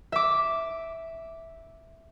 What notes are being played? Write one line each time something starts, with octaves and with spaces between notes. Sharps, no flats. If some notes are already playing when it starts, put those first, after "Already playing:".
E5 D6